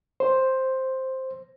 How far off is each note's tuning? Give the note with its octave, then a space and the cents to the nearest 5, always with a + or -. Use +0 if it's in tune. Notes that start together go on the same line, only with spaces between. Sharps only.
C5 +5